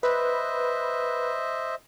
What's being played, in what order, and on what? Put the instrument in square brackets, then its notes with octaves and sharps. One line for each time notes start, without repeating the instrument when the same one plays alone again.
[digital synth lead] B4 [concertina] C5 D#5 E5